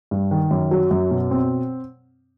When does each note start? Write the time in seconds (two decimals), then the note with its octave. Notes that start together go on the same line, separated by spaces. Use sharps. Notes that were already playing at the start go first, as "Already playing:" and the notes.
0.11 G2
0.31 D#3
0.51 F#2
0.71 F#3
0.91 F#2
1.11 B2
1.31 C4